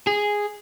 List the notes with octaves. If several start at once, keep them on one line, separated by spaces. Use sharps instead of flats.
G#4